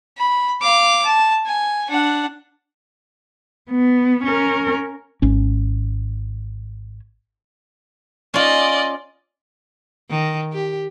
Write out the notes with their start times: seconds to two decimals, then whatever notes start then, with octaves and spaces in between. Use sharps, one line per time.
0.18 B5
0.62 F5 D6
1.05 A5
1.46 G#5
1.90 D4 F#5
3.70 B3
4.24 C#4 A#4
5.22 G#1 C#4
8.34 C#4 F4 D5 D#5
10.10 D#3
10.53 G4